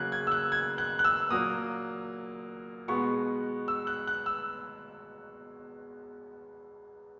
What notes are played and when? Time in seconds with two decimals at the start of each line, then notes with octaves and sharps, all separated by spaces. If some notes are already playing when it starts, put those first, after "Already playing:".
Already playing: C#3 F#3 A#3 F#6 G#6
0.12 G#6
0.27 E6
0.32 F#6
0.52 G#6
0.78 F#6
0.99 F#6
1.05 E6
1.31 A#2 F#3 A#3 D#6
2.88 B2 G#3 B3 C#6
3.68 E6
3.87 F#6
4.07 F#6
4.26 E6